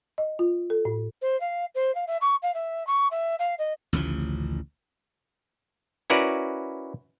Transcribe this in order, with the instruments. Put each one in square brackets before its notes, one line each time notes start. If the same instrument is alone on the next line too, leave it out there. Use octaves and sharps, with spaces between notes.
[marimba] D#5
F4
A4
A2
[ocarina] C5
F5
C5
F5
E5
C#6
F5
E5
C#6
E5
F5
D#5
[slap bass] A1 D2 C#3 F3
[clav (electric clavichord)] C#4 E4 F#4 A#4 B4 D5